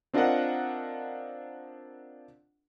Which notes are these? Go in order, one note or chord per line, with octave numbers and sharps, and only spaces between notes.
C4 D4 F4 A#4 D#5 F#5